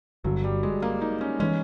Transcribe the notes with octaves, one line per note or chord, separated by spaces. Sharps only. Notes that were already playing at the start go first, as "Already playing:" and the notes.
G1 G2 D3 F#3
G3
G#3
A#3
D#4
C#4
E3 G#3 C#4